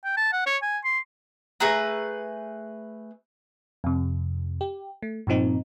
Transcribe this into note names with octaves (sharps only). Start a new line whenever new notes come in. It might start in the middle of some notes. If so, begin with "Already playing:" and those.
G5
A5
F#5
C#5
G#5
C6
A3 G#4 B4 A#5
F2 C3
G4
A3
G2 A#2 F3 C4 D#4